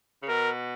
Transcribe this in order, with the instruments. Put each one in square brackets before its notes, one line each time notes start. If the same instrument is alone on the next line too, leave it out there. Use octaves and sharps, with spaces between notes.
[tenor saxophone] C#3
[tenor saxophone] B2 [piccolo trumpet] A#4